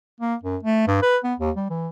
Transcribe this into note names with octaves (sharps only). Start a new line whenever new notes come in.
A#3
F#2
A3
G2
B4
B3
D#2
G3
E3